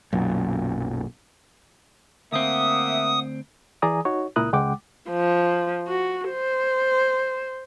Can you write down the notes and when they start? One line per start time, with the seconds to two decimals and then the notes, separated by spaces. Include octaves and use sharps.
0.13 B1 F#2 A#2
2.32 D2 A#3 C4 E5 F#5 D#6
3.82 E3 G#4 D5 G#5 A#5 D#6
4.05 D#4 F#4 C#5
4.36 C#2 A#2 E4 A#4 D#6 F#6
4.53 C#2 G#3 F#5 G5 D6
5.11 F3
5.87 F#4
6.30 C5